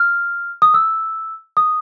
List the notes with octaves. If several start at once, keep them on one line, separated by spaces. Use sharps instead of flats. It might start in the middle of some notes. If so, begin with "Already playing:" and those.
Already playing: F6
D#6
E6
D#6